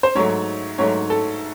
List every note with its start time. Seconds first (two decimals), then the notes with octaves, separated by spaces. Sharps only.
0.03 C5
0.15 G#2 F#3 A3 C#5
0.78 G#2 F#3 A3 C#5
1.10 A4